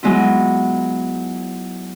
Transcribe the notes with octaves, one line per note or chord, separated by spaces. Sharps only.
F#3 G#3 B3 E4 F4